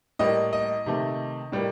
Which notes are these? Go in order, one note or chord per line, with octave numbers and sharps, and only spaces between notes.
A2 G3 A#3 D#5
D#5
C3 D#3 A3
A2 G3 A#3